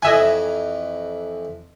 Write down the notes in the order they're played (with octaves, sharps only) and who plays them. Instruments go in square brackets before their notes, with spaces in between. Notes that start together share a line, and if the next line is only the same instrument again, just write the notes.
[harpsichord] F2 E3 [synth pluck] D#5 E5 G#5